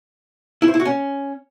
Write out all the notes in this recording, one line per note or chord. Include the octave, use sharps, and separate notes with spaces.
E4
C5
E4
F#4
C#4